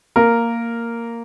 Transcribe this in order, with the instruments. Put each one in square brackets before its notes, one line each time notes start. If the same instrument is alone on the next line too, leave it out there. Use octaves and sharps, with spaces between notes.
[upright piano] A#3 A#4